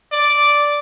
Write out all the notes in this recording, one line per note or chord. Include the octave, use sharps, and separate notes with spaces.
D5